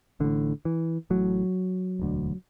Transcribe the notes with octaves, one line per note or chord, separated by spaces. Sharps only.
A1 A2 D3
E3
A1 A2 F#3
E1 D2 D3